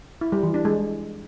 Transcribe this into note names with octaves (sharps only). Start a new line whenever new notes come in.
E4
G3
E3
D4
G#3